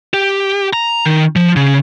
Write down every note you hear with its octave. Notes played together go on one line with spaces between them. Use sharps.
G4
A#5
D#3
F3
C#3